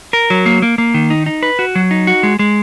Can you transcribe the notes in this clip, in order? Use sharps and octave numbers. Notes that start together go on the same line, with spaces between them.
A#4
F#3
A#3
A#3
A#3
D#3
D#4
D#4
B4
F#4
F#3
D#4
F#4
G#3
G#3